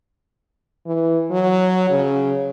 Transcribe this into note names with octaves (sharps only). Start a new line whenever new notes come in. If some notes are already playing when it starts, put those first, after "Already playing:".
E3
F#3
C#3